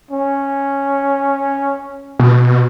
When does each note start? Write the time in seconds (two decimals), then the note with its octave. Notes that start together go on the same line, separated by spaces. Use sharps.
0.11 C#4
2.19 B2